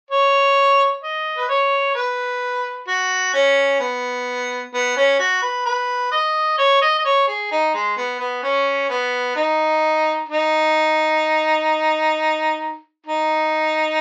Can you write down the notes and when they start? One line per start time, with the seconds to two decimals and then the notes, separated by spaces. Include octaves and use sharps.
0.11 C#5
1.04 D#5
1.38 B4
1.49 C#5
1.95 B4
2.88 F#4
3.34 C#4
3.81 B3
4.74 B3
4.97 C#4
5.19 F#4
5.42 B4
5.66 B4
6.12 D#5
6.58 C#5
6.82 D#5
6.99 D#5
7.05 C#5
7.28 G#4
7.52 D#4
7.74 G#3
7.97 B3
8.20 B3
8.43 C#4
8.90 B3
9.36 D#4
10.29 D#4
13.07 D#4